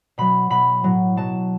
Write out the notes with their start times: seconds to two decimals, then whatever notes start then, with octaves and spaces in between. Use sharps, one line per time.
0.18 B2 F#3 B5
0.50 B2 F#3 B5
0.84 A2 F#3
1.17 B2 F#3 A5